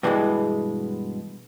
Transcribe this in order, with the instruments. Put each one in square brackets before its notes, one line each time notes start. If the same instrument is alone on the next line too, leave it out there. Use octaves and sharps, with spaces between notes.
[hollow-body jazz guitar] G2 B2 E3 G3 G#3